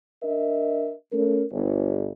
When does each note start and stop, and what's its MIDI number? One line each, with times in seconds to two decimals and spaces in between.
0.23 0.93 62
0.23 0.93 70
0.23 0.93 75
0.23 0.93 76
1.12 1.44 57
1.12 1.44 61
1.12 1.44 70
1.51 2.10 31